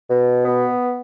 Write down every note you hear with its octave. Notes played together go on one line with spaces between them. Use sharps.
B2
B3